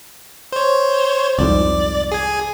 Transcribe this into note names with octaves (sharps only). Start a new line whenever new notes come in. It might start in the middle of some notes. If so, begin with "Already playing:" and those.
C5 C#5
C2 F2 G#2 D5
G#4 G#5